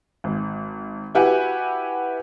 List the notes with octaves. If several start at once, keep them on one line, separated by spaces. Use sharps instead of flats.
G#1
E4 F#4 G4 B4 F#5 G#5